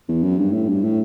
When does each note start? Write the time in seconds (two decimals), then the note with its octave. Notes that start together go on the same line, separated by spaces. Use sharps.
0.09 E2
0.23 F#2
0.39 G2
0.53 A2
0.69 G2
0.84 A2